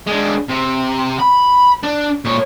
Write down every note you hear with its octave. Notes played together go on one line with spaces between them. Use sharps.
G#3 D4
C3
B5
D4
A#2 C#5